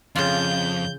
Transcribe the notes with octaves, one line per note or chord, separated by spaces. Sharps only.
F2 C#3 F4 G6